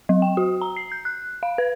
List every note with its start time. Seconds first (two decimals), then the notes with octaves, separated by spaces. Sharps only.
0.09 F#3
0.22 G5
0.37 F#4
0.61 A#5
0.76 C7
0.92 G6
1.05 F#6
1.43 F5
1.58 B4